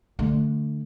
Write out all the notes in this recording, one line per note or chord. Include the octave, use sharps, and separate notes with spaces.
D3 A3